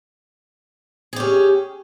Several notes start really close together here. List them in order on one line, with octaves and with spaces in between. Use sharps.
G#4 G4 C#4